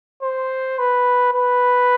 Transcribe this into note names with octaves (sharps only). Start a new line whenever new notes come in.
C5
B4
B4